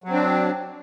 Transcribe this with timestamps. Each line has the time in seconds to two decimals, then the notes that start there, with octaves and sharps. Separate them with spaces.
0.04 F#3
0.09 C4
0.13 D4